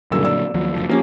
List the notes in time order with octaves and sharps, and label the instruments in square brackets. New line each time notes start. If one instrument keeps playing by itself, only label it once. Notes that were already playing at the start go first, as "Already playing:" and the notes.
[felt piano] F#1 G3 E6 [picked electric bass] A#2 D3 F#3
[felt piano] D5 E6
[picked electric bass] D#2 F3 F#3
F#1 D2 F3
[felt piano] F3 C#4 G4 [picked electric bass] A#3